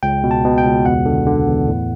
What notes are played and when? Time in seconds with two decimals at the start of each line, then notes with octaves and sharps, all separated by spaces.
0.03 C#2 G5
0.24 B2
0.31 A5
0.44 B2
0.58 G5
0.65 C#2
0.85 E2 F#5
1.05 D3
1.27 D3
1.47 E2
1.67 A2